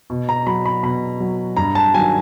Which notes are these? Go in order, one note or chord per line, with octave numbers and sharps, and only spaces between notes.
B2
A#5
F#3 B5
B5
B2 B5
F#3
G2 A#5
A5
D#3 F#3 G#5